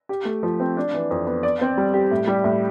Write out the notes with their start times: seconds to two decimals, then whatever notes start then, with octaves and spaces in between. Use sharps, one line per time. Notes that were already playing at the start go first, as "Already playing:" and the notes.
0.09 G4
0.25 A3
0.43 F3
0.60 C4
0.77 D4
0.94 E3
1.11 F2
1.27 B3
1.43 D5
1.61 C4
1.78 G3
1.94 G4
2.11 A2
2.27 G3
2.44 A2